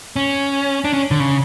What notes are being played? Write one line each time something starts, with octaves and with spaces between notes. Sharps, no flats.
C#4
D4
C#4
D3
C#3